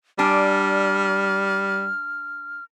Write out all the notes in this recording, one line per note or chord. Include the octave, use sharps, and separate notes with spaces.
G3 D4 G#5 F6